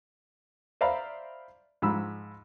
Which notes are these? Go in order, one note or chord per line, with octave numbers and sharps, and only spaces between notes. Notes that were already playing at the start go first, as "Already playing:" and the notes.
C5 D5 E5 F5 A#5 B5
G#2 F3 B5 E6